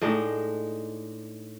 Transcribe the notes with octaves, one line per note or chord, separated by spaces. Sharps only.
A2 G#3 D4 D#4